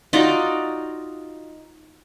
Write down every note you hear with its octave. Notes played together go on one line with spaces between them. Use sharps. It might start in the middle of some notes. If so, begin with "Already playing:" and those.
D#4 F4 F#4 D5